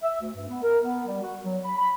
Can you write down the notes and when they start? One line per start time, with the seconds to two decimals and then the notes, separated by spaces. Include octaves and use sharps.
0.03 E5
0.20 D2
0.35 G2
0.48 B3
0.62 A#4
0.82 B3
1.06 G3
1.22 F#4
1.44 F#3
1.63 B5
1.77 B5